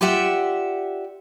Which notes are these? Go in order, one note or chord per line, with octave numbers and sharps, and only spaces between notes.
F4 G4 D5 E5 F#5 G5